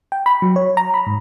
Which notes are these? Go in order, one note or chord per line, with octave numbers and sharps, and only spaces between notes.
G5
B5
F#3
C#5
A#5
B5
G#2